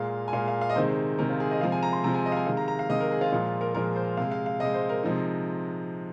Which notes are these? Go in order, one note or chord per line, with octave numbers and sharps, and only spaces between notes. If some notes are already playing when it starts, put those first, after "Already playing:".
Already playing: A#2 G#3 F5
G#5
A#2 G#3 F5
F5
F5
D#5
C3 D#3 G#3 C5
C3 D#3 G#3 A#4
F4
G#4
D#5
C3 F3 G#3 F5
G#5
A#5
C6
C3 F3 G#3 A#5
G#5
D#5
F5
G#5
C3 D#3 G#3 F5
A#5
A#5
F5
C3 D#3 G#3 D#5
A#4
G#4
F4
A#2 F3 G#3 F4
A#4
A#2 F3 G#3 A#4
C5
C3 G#3 F5
F5
F5
C3 G#3 D#5
C5
A#4
C3 F3 G#3 D#4